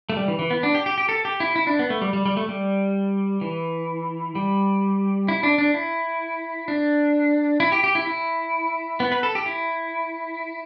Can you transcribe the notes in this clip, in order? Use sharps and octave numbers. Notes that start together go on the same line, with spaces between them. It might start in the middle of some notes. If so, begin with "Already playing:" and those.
A3
G3
E3
E3
B3
D4
G4
G4
G4
A4
G4
E4
E4
D4
B3
A3
G3
G3
G3
A3
G3
E3
G3
E4
D4
D4
E4
D4
E4
G4
G4
E4
E4
B3
B4
A4
G4
E4